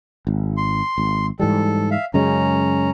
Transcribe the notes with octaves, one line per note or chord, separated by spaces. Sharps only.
G#1
C6
G#1
G#2 E3 G3 A4
E5 F5
F#2 C#3 G#3 C#4 A#5